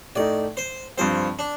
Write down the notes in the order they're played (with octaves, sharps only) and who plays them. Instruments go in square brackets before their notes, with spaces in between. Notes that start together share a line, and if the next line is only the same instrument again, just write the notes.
[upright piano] A2 A3 D#4 [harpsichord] D5
[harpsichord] C5
[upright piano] G2 F3 C4 [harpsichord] C5
[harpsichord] D4